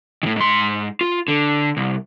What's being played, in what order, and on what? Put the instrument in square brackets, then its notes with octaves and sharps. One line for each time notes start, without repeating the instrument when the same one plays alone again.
[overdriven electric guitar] A2 D#3
G#2 C6
F4
D3
C2